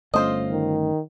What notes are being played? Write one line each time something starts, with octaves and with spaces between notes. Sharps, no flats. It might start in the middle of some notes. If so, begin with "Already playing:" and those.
G1 A3 C#4 F4 C5 D#5
D#3